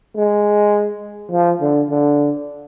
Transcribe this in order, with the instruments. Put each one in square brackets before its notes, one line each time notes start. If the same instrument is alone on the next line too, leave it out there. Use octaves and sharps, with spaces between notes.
[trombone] G#3
F3
D3
D3